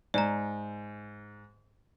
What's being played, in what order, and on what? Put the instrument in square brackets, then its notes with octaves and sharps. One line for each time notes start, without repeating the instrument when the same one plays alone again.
[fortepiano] G#2 [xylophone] D5 A#5